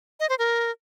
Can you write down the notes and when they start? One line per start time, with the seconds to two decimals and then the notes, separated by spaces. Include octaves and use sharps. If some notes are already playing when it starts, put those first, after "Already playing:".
0.20 D#5
0.29 C5
0.39 A#4